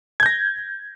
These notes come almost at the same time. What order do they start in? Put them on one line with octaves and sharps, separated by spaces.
G#6 G6 A#6